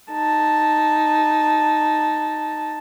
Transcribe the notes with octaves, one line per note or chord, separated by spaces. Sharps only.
D#4 A5